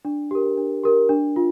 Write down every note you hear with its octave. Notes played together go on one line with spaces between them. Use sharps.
D4
G4 A#4
D4
G4 A#4
D4
F4